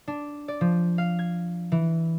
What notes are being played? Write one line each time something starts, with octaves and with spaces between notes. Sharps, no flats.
D4
D5
F3
F5
G#6
E3